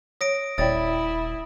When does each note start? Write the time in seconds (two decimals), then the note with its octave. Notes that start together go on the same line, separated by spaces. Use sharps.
0.21 C#5 D#6 A#6 D7
0.58 D#1 E4 C#5 D5 G5 D#6 A6